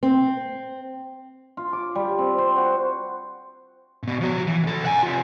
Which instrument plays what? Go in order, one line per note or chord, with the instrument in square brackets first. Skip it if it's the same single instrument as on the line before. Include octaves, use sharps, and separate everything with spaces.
[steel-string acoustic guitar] C4
[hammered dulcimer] F4
D6
G3
C4
C5
F#4
[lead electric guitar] A#2 B3
F3 F#4
E3
B1 A4
F#5 G#5
C3 F4